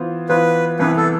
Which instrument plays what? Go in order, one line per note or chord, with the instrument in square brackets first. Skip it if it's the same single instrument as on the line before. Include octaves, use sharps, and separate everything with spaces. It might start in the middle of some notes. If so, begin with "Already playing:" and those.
Already playing: [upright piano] E3 B3 F4 C5
[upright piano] E3 B3 F4 C5 [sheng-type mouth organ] B4
[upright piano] C2 C3 E3 B3 [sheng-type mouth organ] B4
[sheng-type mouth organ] A4